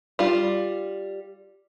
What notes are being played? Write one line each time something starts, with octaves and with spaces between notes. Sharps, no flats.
G3 F4